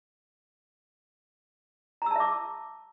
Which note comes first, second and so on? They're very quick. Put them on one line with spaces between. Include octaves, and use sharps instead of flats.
A#5 E6 A5 E5 D6